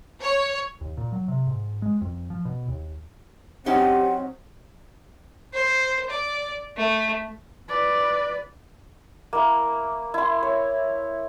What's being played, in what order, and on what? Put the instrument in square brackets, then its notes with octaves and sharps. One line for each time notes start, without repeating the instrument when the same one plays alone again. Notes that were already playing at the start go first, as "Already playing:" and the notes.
[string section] C#5
[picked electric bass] D#2
A#2
F#3
C3
G#2
G#3
F2
F3
B2
D#2
[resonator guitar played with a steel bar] F#3 C#4 D#4 [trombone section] C4 [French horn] G4 [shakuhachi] F#5
[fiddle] C5
D5
A3
[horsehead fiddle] B4 D5
[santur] A#3 E4
E4 C6
C#5